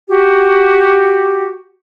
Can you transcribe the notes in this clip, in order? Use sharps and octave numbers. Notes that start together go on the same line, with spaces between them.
F#4 G4